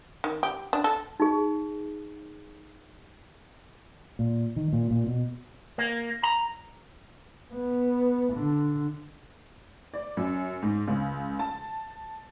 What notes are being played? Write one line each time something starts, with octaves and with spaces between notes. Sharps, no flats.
D#3
G4
D4
A4
D#4 G#4
A#2
D#3
A#2
A#2
B2
A#3
A#5
B3
D3
D5
F#2
G#2
C#2
A5